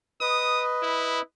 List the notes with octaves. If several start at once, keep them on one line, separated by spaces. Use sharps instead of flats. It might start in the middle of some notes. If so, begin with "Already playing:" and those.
B4 D#5 D#6
E4